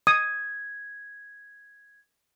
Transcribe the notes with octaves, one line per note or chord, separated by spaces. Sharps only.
D#6 G#6